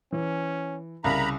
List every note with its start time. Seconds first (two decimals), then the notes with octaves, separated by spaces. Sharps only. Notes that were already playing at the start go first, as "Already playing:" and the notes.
0.12 E3 C#4
1.04 C2 C#3 A#4 F5 A#5 B5